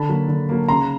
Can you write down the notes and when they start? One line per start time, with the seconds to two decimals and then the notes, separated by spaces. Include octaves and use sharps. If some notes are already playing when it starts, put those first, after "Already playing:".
Already playing: D3 A5 B5
0.09 F#3 A#3
0.28 D3
0.49 F#3 A#3
0.69 C#3 A#5 C6